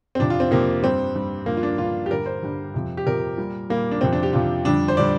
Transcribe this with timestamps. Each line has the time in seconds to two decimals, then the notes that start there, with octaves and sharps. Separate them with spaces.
0.15 C4
0.19 F2 C3 F3 D4
0.30 F4
0.40 C4
0.51 F2 C3 F3 A#3
0.82 G2 G3 C4
1.15 G2 G3
1.46 G2 F3 A#3
1.57 F4
1.63 D4
1.78 G2 F3 F4
2.06 G4
2.10 G2 D3 G3 A#4
2.26 C5
2.43 G2 D3 G3
2.74 F2 C3 F3
2.97 G4
3.06 F2 C3 F3 A#4
3.37 A#2 G3
3.70 A#2 G3 A#3
3.91 D4
4.01 F2 C3 F3 C4
4.13 D4
4.23 G4
4.33 F2 C3 F3 F4
4.65 F2 D3 G3 D4
4.88 C5
4.97 D3 G3 D5